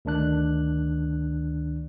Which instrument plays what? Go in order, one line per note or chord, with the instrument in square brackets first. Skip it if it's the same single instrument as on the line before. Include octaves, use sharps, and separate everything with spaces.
[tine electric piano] D2 D#3 D4 F#6